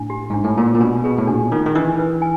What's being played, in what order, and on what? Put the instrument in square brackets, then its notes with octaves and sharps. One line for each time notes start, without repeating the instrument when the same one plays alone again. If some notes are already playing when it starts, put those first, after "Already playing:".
Already playing: [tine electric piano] A2 [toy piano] D4
[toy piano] G4
[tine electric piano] G#2 [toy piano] D4
[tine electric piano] A2
[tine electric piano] A#2 [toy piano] F4
[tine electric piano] A#2
[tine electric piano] B2 [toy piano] D4
[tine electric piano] B2 [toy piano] G#4
[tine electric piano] A2
[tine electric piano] A#2 [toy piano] D4
[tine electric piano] D#3 [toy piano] F4
[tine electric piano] D#3
[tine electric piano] E3 [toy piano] D4
[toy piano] B4
G#5